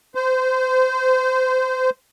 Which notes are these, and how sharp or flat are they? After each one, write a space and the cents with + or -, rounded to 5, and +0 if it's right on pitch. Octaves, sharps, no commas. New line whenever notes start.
C5 -25